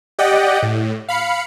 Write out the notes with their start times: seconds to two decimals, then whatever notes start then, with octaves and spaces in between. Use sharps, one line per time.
0.19 G4 D5 D#5 F#5 G5
0.62 A2
1.08 F5 B5 C#7